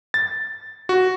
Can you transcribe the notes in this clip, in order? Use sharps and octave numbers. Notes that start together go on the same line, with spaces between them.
A6
F#4